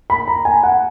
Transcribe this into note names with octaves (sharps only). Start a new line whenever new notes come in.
B5
A#5
G#5
F#5